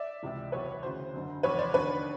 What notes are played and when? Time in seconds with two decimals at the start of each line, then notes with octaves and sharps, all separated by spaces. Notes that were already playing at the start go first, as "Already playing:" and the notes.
Already playing: D5 E5
0.22 C#2 C3 E3
0.52 F#1 E2 B2 B4 C#5
0.83 D2 C#3 E3 C5
1.13 F#1 F#2 D3
1.43 F1 E2 B2 B4 C#5
1.59 C5 D5
1.74 D#2 D3 B4 C#5